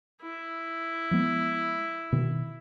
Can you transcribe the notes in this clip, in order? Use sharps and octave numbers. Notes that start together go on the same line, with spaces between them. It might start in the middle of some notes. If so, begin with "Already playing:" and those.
E4
F3 G#3 B3
B2 D#3